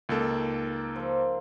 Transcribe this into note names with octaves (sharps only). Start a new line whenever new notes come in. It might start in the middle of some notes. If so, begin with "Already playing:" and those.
C#2 A#3 D#4 A4 A#4
F3 A#4